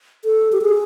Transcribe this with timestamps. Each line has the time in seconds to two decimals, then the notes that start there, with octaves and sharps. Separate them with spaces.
0.25 A4
0.52 G4
0.62 G#4